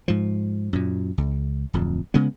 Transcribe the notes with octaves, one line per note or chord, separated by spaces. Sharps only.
G#2 F3
F#2 A#2
C#2
D1 F2
C#3 G#3 B3